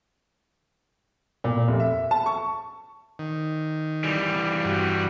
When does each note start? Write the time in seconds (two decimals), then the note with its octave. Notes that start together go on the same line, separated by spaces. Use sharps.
1.44 A#2
1.68 F1
1.80 E5
2.11 A5
2.26 C#6
3.19 D#3
4.04 E3 G3
4.65 G2 F#4